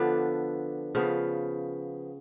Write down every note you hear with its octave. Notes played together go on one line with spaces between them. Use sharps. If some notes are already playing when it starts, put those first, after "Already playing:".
Already playing: D3 F3 B3 D4
C#3 F3 B3